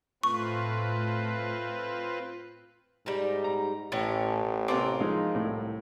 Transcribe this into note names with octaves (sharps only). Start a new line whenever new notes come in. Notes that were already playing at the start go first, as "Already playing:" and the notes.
A2 A3 C4 F4 B4 C#6
G#2 G3 D#4
A#5
A1 A2 C#4
C3 B3 C4 F4 A#4 D6
F3 G#3 D#4
C2 A2